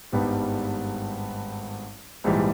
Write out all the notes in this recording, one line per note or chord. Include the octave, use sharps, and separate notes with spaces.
G#1 G2 G3 B3 D#4
A#1 G#2 E3 G3